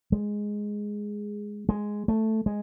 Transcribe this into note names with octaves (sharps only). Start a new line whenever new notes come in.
G#3
G#3
A3
G#3